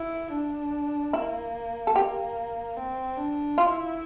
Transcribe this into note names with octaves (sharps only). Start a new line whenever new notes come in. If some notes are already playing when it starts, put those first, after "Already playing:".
Already playing: E4
D4
A#3 E4
A4
A#3 G4
C4
D4
E4 F4